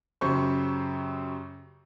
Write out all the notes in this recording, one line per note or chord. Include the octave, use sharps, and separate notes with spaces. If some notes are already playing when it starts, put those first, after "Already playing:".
F#2 C#3 G4 C5 C#6